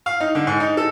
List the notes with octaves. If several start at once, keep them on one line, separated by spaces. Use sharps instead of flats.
F5
D#4
D3
G#2
D#4
A4